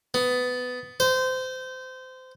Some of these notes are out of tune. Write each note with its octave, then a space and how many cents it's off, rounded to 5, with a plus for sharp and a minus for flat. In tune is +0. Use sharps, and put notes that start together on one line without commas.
B3 +15
C5 -25